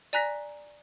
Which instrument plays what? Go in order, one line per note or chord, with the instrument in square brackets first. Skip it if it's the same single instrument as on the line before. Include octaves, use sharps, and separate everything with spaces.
[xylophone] D5 G#5 A#5 F#6 A#6 B6